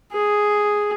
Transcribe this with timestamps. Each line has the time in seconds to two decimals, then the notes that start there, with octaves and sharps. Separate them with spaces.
0.12 G#4